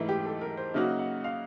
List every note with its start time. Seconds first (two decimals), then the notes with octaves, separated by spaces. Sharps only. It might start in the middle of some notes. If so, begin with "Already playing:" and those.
Already playing: G#2 E3 A3 D#4 E4
0.09 G4
0.25 A4
0.41 A#4
0.57 C5
0.74 C#3 F#3 A#3 D#4 F#4 E5
0.99 F#5
1.24 F5